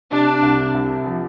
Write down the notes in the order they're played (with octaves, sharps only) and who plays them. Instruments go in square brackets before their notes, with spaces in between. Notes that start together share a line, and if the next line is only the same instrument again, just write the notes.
[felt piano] C3 [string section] D4
[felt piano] C2
C2
F3